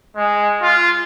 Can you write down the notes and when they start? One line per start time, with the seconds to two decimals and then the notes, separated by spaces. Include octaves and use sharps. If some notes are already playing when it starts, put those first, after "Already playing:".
0.16 G#3
0.62 F4